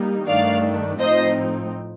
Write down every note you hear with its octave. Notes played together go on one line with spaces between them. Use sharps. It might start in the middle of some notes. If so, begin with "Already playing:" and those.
Already playing: G3 A#3 D#4
G2 D#3 A3 D4 D5 F5
A2 F3 C4 D#4 C5 D#5